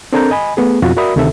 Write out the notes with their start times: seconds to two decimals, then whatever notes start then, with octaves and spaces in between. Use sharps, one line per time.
0.13 C4 D4 A4 A#4 A#5 G6
0.31 D#5 G#5 B5
0.57 A3 B3 G#4
0.82 F2 B2 F4 F#4
0.97 F#4 A#4 D5 E5 B5 D#6
1.16 D2 C3 D#3 A4 E5